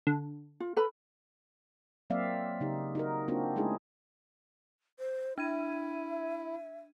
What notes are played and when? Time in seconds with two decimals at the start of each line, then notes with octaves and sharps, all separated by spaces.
0.07 D3
0.60 F4
0.76 A4 B4 B5
2.10 F#3 A#3 C4 D5 E5 F5
2.60 C#3 D#4 G4
2.95 D#4 F#4 A#4
3.28 A#3 C4 D4 D#4 F4 F#4
3.56 G#3 A3 C#4 D#4 E4 G#4
4.99 C5
5.38 D4 E4 E5 G#6 D#7